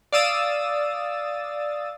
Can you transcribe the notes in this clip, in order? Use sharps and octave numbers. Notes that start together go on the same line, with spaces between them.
D5 F5 D#6 E6 A6